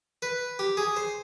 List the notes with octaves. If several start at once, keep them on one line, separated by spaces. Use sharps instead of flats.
B4
G4
G#4
C5